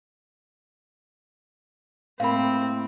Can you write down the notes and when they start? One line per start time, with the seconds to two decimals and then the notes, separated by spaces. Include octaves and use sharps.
2.20 A2 A#3 C4 F5 B5